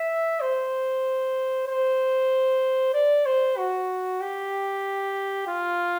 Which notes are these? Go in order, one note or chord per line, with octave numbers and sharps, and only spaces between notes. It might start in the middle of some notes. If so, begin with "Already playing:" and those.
Already playing: E5
C5
C5
D5
C5
F#4
G4
F4